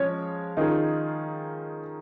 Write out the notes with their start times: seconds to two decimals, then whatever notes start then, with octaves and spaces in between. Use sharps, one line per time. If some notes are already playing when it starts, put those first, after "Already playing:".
Already playing: F3 G#3 C#4 C#5
0.57 D#3 C#4 D#4 F4 G#4